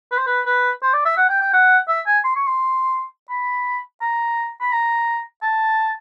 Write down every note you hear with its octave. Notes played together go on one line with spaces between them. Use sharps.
B4
C5
B4
B4
C5
D5
E5
F#5
G5
G5
F#5
E5
G#5
C6
C#6
C6
B5
A#5
B5
A#5
A5